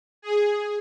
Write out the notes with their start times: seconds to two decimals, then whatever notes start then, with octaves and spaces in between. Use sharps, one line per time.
0.22 G#4